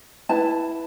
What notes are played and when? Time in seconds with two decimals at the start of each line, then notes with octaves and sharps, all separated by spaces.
0.29 E4 B4 A5